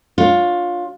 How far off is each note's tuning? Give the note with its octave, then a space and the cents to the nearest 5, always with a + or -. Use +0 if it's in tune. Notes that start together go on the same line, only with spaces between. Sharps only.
D4 +0 F4 +15 C#5 +5